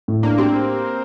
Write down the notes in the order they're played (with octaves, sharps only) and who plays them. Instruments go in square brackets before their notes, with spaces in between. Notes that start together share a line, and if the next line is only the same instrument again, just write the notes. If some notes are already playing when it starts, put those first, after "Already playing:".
[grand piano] A2
[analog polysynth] A#3 [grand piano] D4
[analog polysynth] C4 [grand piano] G4